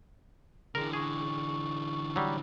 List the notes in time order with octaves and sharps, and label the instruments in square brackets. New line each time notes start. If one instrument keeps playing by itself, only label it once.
[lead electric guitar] D3 E3 [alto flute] G#4 [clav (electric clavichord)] A#4
[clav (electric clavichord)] G#4 [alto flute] C#6
[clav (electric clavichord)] F#3 G3